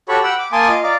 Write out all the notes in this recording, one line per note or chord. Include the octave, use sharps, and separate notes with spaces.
F#4 G4 A4 C#5 B5 C#6
F#5 G5 B5 E6
D6
A#3 G#5 A5 C6 D6 D#6
F4 D#5 F5
D5 F5 A#5 D6